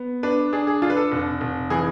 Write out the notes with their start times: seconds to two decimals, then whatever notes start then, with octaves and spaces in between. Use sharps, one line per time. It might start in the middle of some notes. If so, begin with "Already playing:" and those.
Already playing: B3
0.23 D4 B4
0.53 D4 G#4
0.67 G#4
0.82 D4 F4
0.90 B4
0.96 A4
1.12 F1
1.41 F1
1.70 E3 G#4